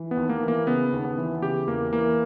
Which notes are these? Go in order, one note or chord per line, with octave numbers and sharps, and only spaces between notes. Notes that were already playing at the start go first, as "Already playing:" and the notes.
Already playing: E3
B3
D#2
A#3
E3
A#3
C#3 B3
D#2
B3
E3
C#3 G4
E2 A#3
E3 A#3